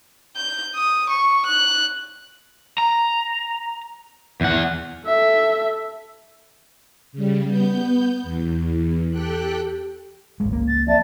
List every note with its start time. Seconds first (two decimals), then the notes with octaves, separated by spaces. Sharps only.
0.37 G6
0.75 D#6
1.10 C#6
1.47 F#6
2.78 A#5
4.41 E2 F#5
5.06 A4 E5
7.12 C#3 G3
7.47 B3 G6
8.23 E2
9.10 G4 A4 G5 F#6
10.40 G#1 C#2 G#3
10.52 A#3
10.67 A6
10.87 F2 D5 E5 A5 A6